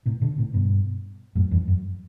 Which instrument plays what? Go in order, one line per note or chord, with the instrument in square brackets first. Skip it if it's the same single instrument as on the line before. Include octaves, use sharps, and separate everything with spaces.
[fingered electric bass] A2 C3
B2 D3
A2 C3
G2 B2
F#2 A2
E2 G2
F#2